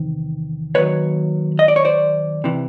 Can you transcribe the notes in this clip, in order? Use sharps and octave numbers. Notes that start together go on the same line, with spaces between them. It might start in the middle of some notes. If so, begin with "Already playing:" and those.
Already playing: E2 C3 D#3
D#2 D#3 F#3 B4 C#5
D#5
D5
C#5
C5 D5
C3 E3